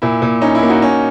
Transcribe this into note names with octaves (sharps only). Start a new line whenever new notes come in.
A#2 E4
A#2
C#4 D#4
E4
A#3
D#4 F#4
C#4